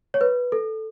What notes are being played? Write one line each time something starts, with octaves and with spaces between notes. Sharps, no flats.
C#5
B4
A4